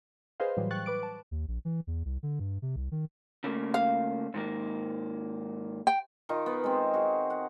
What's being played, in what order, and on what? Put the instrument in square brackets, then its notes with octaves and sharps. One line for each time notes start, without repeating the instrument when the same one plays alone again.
[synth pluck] G#4 B4 C5 D#5 F5
A2 E3 F#3 G3
G5 C#6 F#6 A6
B4 D6 D7
A5
[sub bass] D#2
A#1
E3
E2
C2
D3
G2
C3
C2
D#3
[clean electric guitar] C#3 A3 A#3
[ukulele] F5
[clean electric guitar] G#2 D#3 A#3
[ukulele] G5
[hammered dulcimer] D#3 D#4 F4
B3
G#3 C4
F#4 G#4
F#5